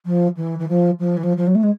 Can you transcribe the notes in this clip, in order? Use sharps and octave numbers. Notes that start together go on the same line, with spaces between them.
F3
E3
E3
F3
F3
E3
F3
F3
F#3
A3
G#3